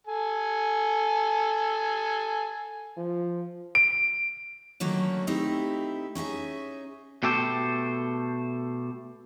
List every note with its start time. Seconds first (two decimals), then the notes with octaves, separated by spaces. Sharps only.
0.07 A4 G#5
2.97 F3
3.75 D7
4.80 D3 D#3 F#3 A3 A#3 C#4
5.27 A3 C4 D#4 E4 G4
6.15 C#4 D#4 G#4 E5
7.23 B2 A3 G4 A4 C5